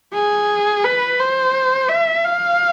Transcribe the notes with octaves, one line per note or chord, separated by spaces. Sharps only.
G#4
B4
C5
E5
F5